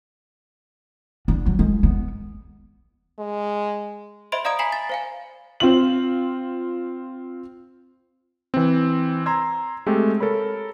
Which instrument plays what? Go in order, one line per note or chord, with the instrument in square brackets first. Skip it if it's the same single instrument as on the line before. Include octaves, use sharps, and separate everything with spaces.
[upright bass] D4
F#3
G#3
B3
[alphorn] G#3
[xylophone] C5 D#5 E5 B5 C6 D7
D5 F5 A#5 D#6 G#6 D7
G#5 A#5 B5 B6 C7 F#7
A6
C5 F5 G#5
[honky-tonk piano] C4 F4 F#7
[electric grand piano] E3 C4
A#5 C6 E6 G#6
G#3 A3 C4 G4 A4
A4 A#4 C#5 B5